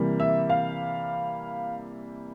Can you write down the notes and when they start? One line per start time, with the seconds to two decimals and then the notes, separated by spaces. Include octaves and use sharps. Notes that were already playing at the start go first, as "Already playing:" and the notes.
Already playing: C3 E3 G3 A#3
0.20 E5
0.50 F5